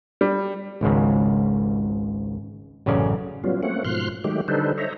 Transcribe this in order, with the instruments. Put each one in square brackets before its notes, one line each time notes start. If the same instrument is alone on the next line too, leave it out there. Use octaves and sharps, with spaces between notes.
[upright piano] G3
[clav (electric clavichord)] G#1 C#2 G#2 C#3
A1 F#2 C#3 C#4 D5
[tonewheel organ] F#3 G3 B3 C#4 F4
A3 A#3 C4 C#4 F#5
G#2 B2 F3 C6 F6 F#6
D#3 F#3 G#3 A3 G4
D3 G3 D#4 A4 B4 C5
C5 C#5 D#5 E5 A#5